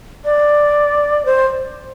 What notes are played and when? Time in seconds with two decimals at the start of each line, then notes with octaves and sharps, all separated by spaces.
0.24 D5
1.25 C5